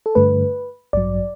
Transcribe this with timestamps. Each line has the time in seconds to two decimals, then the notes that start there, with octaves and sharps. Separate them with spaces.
0.06 A4
0.15 G2 D3 A3 B4
0.93 A1 G2 F#3 D5